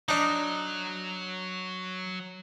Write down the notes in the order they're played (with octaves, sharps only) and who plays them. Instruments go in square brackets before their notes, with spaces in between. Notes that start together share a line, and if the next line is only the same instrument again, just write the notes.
[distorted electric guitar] F#3 [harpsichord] D4 D#4